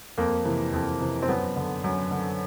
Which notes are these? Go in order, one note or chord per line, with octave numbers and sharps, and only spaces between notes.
F2 A#3
C3 E3
F2
C3 E3
C4
F#2 B3
D3
F#2
D3